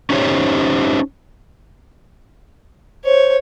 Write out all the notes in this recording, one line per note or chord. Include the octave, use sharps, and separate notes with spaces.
C#4 D#4 G4 C5 C#5
C5 C#5